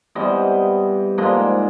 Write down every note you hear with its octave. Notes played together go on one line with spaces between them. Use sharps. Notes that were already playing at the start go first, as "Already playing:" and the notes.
C3 E3 G3 B3 D#5
G#2 F3 A#3 D4 D#5